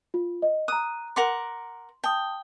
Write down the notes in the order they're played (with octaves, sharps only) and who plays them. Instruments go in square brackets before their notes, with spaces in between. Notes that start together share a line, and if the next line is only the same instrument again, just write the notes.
[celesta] F4
D#5
[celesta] A#5 F#6 [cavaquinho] D#6
[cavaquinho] A#4 F#5 D6 [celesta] C6
[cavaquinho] G5 [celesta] A5 D#6